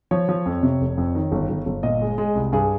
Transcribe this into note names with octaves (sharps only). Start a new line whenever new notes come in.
F3 C#5
F3
F2
C3
F1
F2
D#3
G1
G1
G1
A#2 D#5
G#3
G#3
C2
G2 G#4